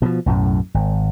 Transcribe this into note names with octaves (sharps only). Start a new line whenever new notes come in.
B2 E3 F3
B1 F#2 A2
G#1